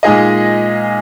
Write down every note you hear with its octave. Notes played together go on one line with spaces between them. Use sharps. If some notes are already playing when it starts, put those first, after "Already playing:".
A#2 G#3 D#4 G#4 D#5